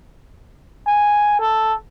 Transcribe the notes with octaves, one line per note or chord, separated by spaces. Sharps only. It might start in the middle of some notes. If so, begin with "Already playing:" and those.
G#5
A4